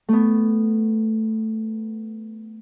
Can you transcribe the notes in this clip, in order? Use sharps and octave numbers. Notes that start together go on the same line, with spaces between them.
A3 B3